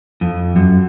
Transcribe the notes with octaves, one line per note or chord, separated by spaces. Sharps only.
F2
F#2